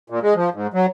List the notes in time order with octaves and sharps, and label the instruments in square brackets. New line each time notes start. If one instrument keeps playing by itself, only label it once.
[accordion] A#2
G#3
F3
G#2
F#3